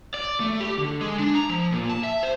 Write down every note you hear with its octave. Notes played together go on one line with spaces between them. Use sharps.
D5
A3
G4
D3
G#3
D4
A#5
F3
A#2
A5
E5
C5